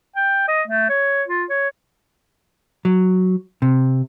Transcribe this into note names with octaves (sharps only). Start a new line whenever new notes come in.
G5
D#5
A3
C#5
F4
C#5
F#3
C3